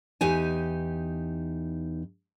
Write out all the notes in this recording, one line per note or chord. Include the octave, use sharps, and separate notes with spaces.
E2 D#4 G4 G#5